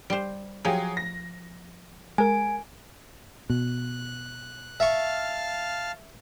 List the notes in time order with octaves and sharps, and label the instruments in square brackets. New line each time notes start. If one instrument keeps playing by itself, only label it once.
[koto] G3 C5
[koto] F3 [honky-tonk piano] F#3 G4 G#4
[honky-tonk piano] A#6
[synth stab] G#3 A#4 [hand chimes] G#5
[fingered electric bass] B2 [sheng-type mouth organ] F#6
[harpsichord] E5 C#6 [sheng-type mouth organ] F5 A5 F6